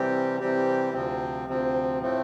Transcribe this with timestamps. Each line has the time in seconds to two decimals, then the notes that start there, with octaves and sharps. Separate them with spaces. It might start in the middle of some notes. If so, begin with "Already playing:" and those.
Already playing: C3 E3 G3 C4 G4
0.40 C3 E3 G3 C4 G4
0.94 D2 C3 F3 C4
1.48 D2 C3 F3 C4
2.01 A2 F3 A3 C4